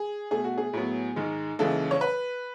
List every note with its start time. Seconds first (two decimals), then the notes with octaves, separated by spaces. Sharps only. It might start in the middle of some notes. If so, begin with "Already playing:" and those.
Already playing: G#4
0.31 B2 A3 G#4
0.44 F#4
0.58 G#4
0.73 A2 F#3 B3
1.16 G#2 D#3 G#3
1.59 D#2 C#3 E3 G#3 A4
1.91 C#5
2.01 B4